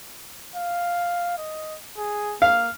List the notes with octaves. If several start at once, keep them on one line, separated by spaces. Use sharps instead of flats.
F5
D#5
G#4
A#3 F5